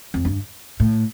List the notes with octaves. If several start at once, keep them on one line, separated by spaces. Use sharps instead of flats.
F2
G2
A2